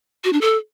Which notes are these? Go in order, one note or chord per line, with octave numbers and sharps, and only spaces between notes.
F#4
D4
A4